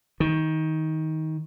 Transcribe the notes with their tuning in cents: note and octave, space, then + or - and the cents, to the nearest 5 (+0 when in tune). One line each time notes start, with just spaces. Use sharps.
D#3 +20